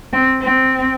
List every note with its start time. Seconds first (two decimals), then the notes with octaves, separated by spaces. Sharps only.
0.13 C4
0.41 C4